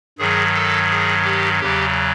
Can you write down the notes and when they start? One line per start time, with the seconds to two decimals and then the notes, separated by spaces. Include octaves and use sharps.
0.18 G2 D#3 F#3 G#4
0.54 A4
0.89 G#4
1.24 G4
1.60 E2 C#3 F#3 G4